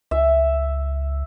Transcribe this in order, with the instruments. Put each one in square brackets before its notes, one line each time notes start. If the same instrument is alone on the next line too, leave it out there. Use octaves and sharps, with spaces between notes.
[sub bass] C#2 [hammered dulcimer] E5